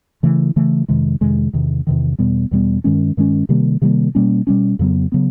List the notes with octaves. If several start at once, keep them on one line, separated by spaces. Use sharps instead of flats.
C#3 E3 A3
C#3 E3 A3
F2 C3 D#3 G#3
F2 C3 D#3 G#3
E2 C3 D#3
E2 C3 D#3
E2 B2 G3 B3
E2 B2 G3 B3
G2 D#3 G#3 C#4
G2 D#3 G#3 C#4
C3 D#3 G3 A#3
C3 D#3 G3 A#3
B2 G3 A#3 C#4
B2 G3 A#3 C#4
F2 C#3 F#3 B3
C#3 F#3 B3